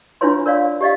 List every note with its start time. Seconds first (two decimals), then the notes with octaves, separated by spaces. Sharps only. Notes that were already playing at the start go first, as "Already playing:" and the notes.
0.21 D4 E4 F4 B4 C#5 C6
0.46 A#4 C#5 D5 F5
0.81 G4 D5 D#5 F5